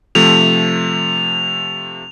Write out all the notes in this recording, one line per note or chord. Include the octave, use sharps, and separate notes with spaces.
C3 F3 A3 F7